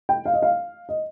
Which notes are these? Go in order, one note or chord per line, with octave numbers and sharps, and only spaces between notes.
G5
F5
D#5
F5
D#5